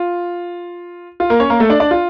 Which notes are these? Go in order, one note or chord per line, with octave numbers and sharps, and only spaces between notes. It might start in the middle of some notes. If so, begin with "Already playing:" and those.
Already playing: F4
F4
A#3 A#4
C#4 C#5
A#3 A#4
A3 A4
D4 D5
D4 D5
F4